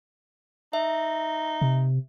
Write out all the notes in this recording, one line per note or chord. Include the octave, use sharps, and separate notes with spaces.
D#4 E5
C3